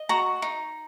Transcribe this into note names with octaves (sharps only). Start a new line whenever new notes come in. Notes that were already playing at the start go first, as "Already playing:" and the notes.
Already playing: D#5
F#4 A#5
D#4